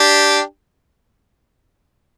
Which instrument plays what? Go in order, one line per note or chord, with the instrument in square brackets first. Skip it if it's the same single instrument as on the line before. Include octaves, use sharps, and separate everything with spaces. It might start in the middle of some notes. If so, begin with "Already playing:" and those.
Already playing: [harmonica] D4 G4